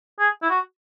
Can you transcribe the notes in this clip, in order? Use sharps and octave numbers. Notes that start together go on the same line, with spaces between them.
G#4
E4
F#4